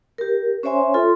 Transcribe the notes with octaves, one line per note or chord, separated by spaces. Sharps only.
G4 A#4
C#4 C5 C#5 E5 G#5 C6
F4 A4 C6